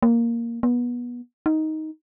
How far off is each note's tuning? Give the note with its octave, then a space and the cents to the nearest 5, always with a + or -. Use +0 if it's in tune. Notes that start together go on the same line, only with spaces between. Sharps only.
A#3 +0
B3 -25
D#4 +10